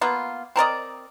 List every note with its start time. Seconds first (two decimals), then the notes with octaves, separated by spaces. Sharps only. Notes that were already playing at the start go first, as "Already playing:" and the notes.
0.01 A#3 B3 F4
0.56 C4 A#4 D5 D#5